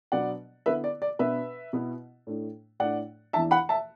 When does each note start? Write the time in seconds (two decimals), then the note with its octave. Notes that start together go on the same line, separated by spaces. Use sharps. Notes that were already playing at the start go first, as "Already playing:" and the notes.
0.12 B2 F#3 B3 D4 D5 F#5
0.66 D3 B3 E4 B4 E5
0.84 D5
1.02 D5
1.19 B2 B3 D4 B4 E5
1.73 B2 B3 E4
2.27 A2 A3 D4
2.80 A2 A3 D4 D5 F#5
3.33 E2 E3 D4 E5 A5
3.51 F#5 B5
3.69 E5 A5